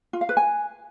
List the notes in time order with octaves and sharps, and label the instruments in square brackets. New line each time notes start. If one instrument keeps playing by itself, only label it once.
[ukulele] F4
F5
B4
G#5